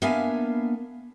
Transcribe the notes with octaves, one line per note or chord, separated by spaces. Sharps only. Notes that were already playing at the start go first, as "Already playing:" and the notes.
A#3 B3 D4 E5 F5 G#5